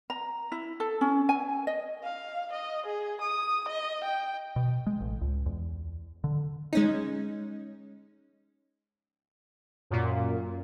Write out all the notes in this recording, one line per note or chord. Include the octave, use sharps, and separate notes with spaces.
A#5
E4
A4
C#4
G#5
D#5
F5
D#5
G#4
D#6
D#5
G5
B2
G#3
A1
C#2
E2
D3
G#3 C#4 D#4
F#2 A#2